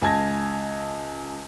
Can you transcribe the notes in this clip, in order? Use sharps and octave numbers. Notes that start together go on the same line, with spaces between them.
C#2 G#5 A5 G#6 A#6